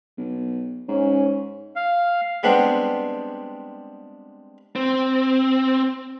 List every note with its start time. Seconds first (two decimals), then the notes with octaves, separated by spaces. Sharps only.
0.17 B1
0.88 G#2 C#4
1.76 F5
2.43 G3 G#3 B3 C4 D4
4.76 C4